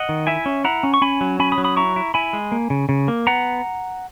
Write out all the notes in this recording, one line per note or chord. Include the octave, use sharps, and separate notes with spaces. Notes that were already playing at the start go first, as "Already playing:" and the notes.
Already playing: D#5 F#5
D#3
E4 E5 G#5
C#4
E4 F#5 A#5
C#4
C#6
C#4 G#5 B5
F#3
C#4 G#5 B5
B5 D#6
F#3
B5 D#6
E4 A#5 C#6
E4
E4 G#5 B5
G#3
A#3
C#3
C#3
A#3
B3 F#5 A#5